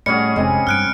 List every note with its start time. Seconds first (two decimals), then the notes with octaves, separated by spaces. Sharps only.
0.06 A2 G3 C#4 F#4 G#4 D#5 C#7
0.36 F1 G#3 C4 G#5
0.67 G2 F6 F#6 D7